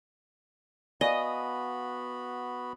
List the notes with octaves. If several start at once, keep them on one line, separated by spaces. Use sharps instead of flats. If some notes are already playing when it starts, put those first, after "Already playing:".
B3 F#4 D5 D#5 F5 G#5 B5